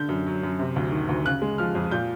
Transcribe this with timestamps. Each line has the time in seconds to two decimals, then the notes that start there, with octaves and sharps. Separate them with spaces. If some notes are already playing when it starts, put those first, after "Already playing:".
Already playing: D3 G6
0.09 F#2
0.27 F#3
0.43 F#2
0.59 C3
0.76 D2
0.92 D#3
1.09 D2
1.25 C#3 F#6
1.42 G#3
1.58 F3 F6
1.75 F2
1.91 A#2 G6